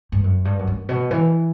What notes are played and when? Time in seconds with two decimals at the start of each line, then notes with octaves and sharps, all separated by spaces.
0.12 G2
0.24 F#2
0.45 G2
0.59 F#2
0.67 G2
0.89 B2
1.11 E3